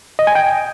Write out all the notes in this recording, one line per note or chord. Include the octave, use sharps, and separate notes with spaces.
D#5
G#5
G5